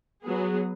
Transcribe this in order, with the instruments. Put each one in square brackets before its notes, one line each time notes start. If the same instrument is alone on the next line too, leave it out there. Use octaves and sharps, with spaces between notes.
[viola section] F#3 B3 G#4